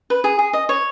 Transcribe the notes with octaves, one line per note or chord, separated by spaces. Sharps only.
B4
G#4
G#4
D#5
C#5